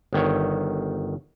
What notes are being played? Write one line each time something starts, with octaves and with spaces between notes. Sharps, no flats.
G1 D#3 C#5